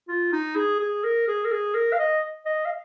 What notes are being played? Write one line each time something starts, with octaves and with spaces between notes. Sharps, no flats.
F4
D#4
G#4
G#4
A#4
G#4
A#4
G#4
A#4
F5
D#5
D#5
F5